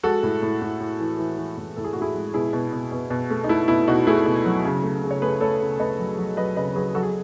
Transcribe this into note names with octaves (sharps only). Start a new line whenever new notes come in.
G#3 F#4 A4
A2
A2
A2
A2
E3
E3
E3
A2
A2 A4
G#4
A2 F#4
E4 G#4
G#3
B2 E4 G#4
B2
B2
B2
B2
A3
D#4
A3 E4
B2 E4
B2 D#4 F#4
A3 E4 G#4
B2
F#3
C#3
A3
C#3
C#5
A3 G#4 B4
A3 A4 C#5
C#3
A3 B4 D#5
F#3
F#3
F#3 B4 D#5
C#3 B4 D#5
F#3 G#4 B4
F#3 F#4 A4
G#4